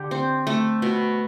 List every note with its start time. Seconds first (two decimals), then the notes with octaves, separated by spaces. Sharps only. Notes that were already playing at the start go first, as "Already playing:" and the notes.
Already playing: D3 G4
0.11 C4
0.47 A3
0.82 B2